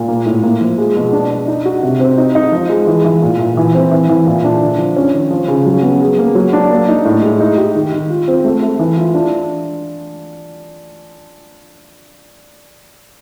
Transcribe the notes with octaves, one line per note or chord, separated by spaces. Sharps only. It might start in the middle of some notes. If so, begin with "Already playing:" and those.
Already playing: A#2
A#3
A2
A#3
F3
G#3
B2
D4
D4
D#4
F#4
C3
C4
D#4
D#4
F3
G#3
E3
E3
A#2
A#2
E3
C4
E3
E3
A#2
D4
D3
F3
C#4
D#3
F3
C#3
F#3
B3
G#4
A#3
F#3
D4
A#3
D#4
A2
G#3
D#4
G4
D#3
D#3
F4
C4
A3
A3
E3
F4
D4